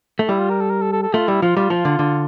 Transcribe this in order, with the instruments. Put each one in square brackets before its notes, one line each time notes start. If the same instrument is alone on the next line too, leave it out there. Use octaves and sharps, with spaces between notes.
[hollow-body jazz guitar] A3
[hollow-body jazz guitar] G3 [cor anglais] E4
[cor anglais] F4
A#4
A4
A#4
A4
A4
A4
[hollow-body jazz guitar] A3 [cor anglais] F4
[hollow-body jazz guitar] G3 [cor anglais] E4
[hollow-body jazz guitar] F3 [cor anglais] F4
[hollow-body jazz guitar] G3 [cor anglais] F4
[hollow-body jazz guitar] F3
D3
D3